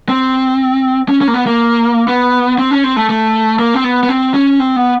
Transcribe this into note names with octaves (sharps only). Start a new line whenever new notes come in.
C4
C#4
C#4
A#3
B3
A#3
B3
C4
C#4
C4
A3
A3
A#3
C4
B3
B3
C4
C#4
C4
B3